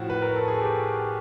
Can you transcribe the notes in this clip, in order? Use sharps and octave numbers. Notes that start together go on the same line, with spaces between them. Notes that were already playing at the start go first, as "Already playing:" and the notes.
Already playing: A2 F3 F#4
B4
A#4
A4
G#4
G4